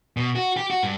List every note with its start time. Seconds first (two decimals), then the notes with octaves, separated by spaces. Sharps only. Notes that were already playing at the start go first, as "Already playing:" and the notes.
0.17 B2
0.35 F#4
0.56 G4
0.70 F#4
0.83 G2